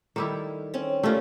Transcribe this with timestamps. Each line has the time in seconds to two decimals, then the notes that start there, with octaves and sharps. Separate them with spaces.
0.16 D#3 G3 E4 A4
0.74 C4 C#4
1.03 G3 A3 A#3 C#4 F4